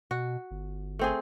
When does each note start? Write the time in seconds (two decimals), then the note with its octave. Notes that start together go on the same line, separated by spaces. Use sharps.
0.11 B2 F#4
0.51 G1
0.99 A3 C4 G#4